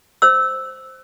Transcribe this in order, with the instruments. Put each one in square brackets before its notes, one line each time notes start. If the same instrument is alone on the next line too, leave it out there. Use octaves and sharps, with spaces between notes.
[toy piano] C5 E6